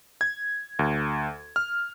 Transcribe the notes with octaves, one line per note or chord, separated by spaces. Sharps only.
G#6
D2
F6